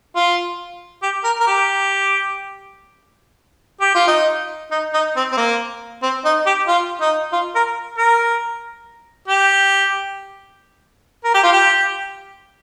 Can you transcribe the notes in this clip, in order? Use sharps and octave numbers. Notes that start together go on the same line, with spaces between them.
F4
G4
A#4
A#4
G4
G4
F4
D#4
D#4
D#4
C4
C4
A#3
C4
D#4
G4
F4
D#4
F4
A#4
A#4
G4
A#4
G4
F4
G4